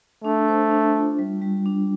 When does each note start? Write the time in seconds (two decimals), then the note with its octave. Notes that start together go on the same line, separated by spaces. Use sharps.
0.24 A3 D4
0.48 C5
0.71 D4
0.95 F4
1.19 G3
1.42 G3
1.66 D4